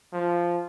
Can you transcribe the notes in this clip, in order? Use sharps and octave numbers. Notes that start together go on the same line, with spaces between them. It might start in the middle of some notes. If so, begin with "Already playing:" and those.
F3